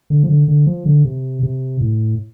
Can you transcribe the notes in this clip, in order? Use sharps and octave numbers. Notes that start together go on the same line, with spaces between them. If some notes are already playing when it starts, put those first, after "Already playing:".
D3
F3
D3
D3
F3
D3
C3
C3
A2